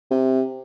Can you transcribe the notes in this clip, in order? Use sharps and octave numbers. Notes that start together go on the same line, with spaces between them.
C3